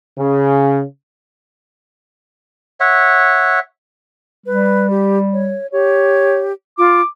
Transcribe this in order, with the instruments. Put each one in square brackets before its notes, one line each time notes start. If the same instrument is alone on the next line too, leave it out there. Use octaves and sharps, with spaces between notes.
[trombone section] C#3
[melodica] C#5 E5 F#5
[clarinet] G3 [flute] B4
[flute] G4
C#5
[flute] G4 [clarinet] C#5
[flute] F4 [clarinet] D6